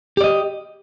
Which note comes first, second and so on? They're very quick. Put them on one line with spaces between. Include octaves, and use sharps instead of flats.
G4 D5 D#5